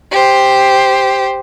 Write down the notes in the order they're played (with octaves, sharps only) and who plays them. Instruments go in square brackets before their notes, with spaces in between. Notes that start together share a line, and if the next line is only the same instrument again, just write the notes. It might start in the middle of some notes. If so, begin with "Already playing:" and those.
[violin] G4 C5